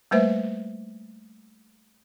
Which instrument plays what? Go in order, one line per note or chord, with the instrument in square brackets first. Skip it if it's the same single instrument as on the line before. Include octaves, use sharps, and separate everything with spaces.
[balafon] G3 A3 A#3 B4 C5 E5